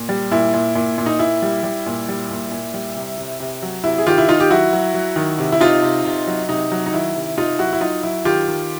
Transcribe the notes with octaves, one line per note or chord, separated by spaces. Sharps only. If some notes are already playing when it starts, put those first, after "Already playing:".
Already playing: A#2
G3
A#2 E4
A#2
A#2
A#2
D#4
A#2 E4
G3
G3
A#2
G3
A#2
A#2
G3
C3
C3
C3
F#3
C3 E4
G#4
D#3 F4 G4
E4
D#3 D#4 F4
G4
F#3 E4 F#4
F#3
F#3
D#3
C3
E4
C3 D#4 F4
C3
C3
F#3
C3 D#4
F#3
D#4
D#3 E4
C3
C3 D#4 F4
F#3 E4 F#4
E4
F#3 D#4 F4
F#3 E4
D#3 F4 G4
D#3